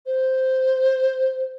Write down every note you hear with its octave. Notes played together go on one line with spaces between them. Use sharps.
C5